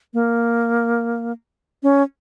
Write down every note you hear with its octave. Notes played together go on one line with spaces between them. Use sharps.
A#3
C#4